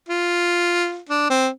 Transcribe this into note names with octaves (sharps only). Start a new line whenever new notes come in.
F4
D4
C4